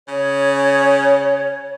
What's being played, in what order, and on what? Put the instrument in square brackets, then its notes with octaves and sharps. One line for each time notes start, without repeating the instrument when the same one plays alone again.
[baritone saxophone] C#3 [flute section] C#5